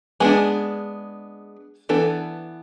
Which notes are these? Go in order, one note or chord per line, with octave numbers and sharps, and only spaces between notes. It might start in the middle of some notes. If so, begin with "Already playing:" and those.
G#3 B3 D4 G#4
E3 B3 D4 A4